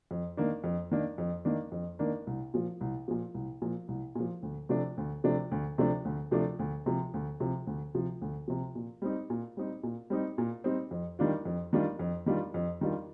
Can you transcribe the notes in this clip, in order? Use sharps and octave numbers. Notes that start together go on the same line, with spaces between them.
F2
D#3 A#3 D4
F2
D#3 A#3 D4
F2
D#3 A#3 D4
F2
D#3 A#3 D4
C2
A#2 F3
C2
A#2 F3
C2
A#2 F3
C2
A#2 F3
D2
C3 F3 A3 D4
D2
C3 F3 A3 D4
D2
C3 F3 A3 D4
D2
C3 F3 A3 D4
D2
C3 F3
D2
C3 F3
D2
C3 F3
D2
C3 F3
A#2
G3 C4 D#4
A#2
G3 C4 D#4
A#2
G3 C4 D#4
A#2
G3 C4 D#4
F2
D#3 G3 D4 F4
F2
D#3 G3 D4 F4
F2
D#3 G3 D4 F4
F2
D#3 G3 D4 F4